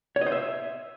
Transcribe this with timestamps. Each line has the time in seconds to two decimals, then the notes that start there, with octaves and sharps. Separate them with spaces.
0.16 C#5
0.21 D#5
0.26 C5
0.32 E5